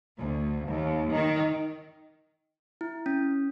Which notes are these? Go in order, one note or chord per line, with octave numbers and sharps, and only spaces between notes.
D2
D#2
D#3
E4
C#4